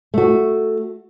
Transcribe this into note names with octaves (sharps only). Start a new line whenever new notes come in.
A3 F#4